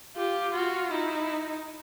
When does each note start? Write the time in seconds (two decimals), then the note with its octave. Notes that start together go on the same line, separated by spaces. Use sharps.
0.16 F4 G4
0.53 F4 F#4
0.91 D#4 E4